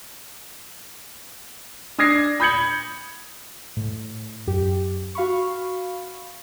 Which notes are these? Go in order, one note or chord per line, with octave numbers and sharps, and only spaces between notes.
D4 D#6 G#6 A#6 C7
B5 D#6 G6 G#6 C#7 F#7
A2
F#2 G4
F#4 F5 B5 C#6